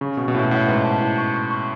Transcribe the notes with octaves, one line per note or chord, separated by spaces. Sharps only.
C#3 C#6
B2 C#6
B2
A2 B4
B2
A2 F#5
G#2 B4
A5
E4
C#6
C#6
C#6